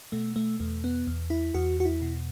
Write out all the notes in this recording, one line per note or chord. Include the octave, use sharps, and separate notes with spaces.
B2 A3
A3
E2 A3
B3
E2
E4
E2 F#4
F#4
E4
B2